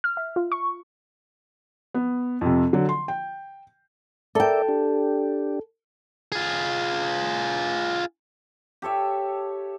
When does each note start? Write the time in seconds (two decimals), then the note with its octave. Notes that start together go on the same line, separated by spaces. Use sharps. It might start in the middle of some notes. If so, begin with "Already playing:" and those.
0.04 F6
0.17 E5
0.36 F4
0.52 C#6
1.94 B3
2.41 F2 C3
2.73 D3 F#3
2.89 C6
3.08 G5
4.35 A4 A#4 D5 E5 G5
4.69 D4 G4
6.32 F4 G#4
8.82 G4 A4 C#5 E5